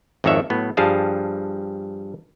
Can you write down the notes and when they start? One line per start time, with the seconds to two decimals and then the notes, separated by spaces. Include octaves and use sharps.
0.24 G#1 F2 D#3 C#5 E5 F#5
0.50 A2 F#3 B3
0.77 G2 F3 G3 G#4 F5 A5